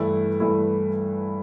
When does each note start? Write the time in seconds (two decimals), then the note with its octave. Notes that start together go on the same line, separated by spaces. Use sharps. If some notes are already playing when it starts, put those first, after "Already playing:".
Already playing: G2 E3 A3 E4
0.40 G2 E3 A3 E4